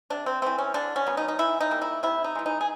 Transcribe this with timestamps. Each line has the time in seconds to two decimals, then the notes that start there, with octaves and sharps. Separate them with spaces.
0.10 C3 D4
0.26 C4
0.42 E3 A3 C4
0.58 C#4
0.74 D3 D4
0.96 C#4
1.07 F#3 B3
1.17 D#4
1.28 D#4
1.39 E3 E4
1.61 D#4
1.71 G3 A#3
1.82 E4
2.03 C3 E4
2.24 D#4
2.35 E3 G#3
2.46 D#4
2.61 G#4